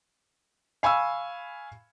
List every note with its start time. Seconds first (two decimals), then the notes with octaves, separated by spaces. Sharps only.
0.83 F5 G#5 B5 C#6 E6